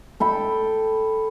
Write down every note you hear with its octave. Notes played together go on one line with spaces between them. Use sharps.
A4 G5 B5